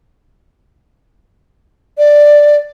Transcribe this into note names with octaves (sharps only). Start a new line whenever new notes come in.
D5